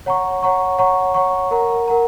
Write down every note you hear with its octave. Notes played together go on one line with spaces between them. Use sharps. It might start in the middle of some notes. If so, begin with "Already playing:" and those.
C#5 F#5 A#5 C#6
C#5 F#5 A#5 C#6
C#5 F#5 A#5 C#6
C#5 F#5 A#5 C#6
A#4 F#5 A#5
A#4 F#5 A#5